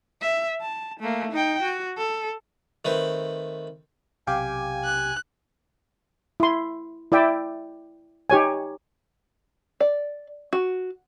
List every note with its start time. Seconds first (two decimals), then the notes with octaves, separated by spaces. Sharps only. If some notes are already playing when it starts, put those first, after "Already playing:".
0.22 E5
0.61 A5
1.00 A3 A#3
1.32 D#4 G5
1.62 F#4
1.97 A4
2.85 D#3 A3 C4 B4
4.27 B1 C3 G4 F5 G5 G#5 D6
4.85 F#6
6.40 E4 C6
7.12 E4 D5 E5 G5
8.30 D#4 G4 C#5 G#5
9.80 D5
10.53 F#4